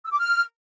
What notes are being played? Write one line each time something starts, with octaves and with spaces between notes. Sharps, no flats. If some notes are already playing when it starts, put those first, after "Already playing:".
E6
D6
F6